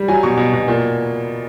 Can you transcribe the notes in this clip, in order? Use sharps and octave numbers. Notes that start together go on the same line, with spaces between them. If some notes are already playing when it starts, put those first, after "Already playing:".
Already playing: G3
F#3 G#5
B2 C#6
B2
B2
A#2